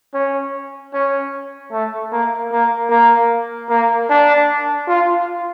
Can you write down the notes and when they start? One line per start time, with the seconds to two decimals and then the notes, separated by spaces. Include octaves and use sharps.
0.14 C#4
0.93 C#4
1.72 A3
2.12 A#3
2.52 A#3
2.90 A#3
3.69 A#3
4.10 D4
4.88 F4